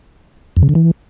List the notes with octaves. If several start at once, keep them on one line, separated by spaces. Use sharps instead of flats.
F2
C#3
D3
E3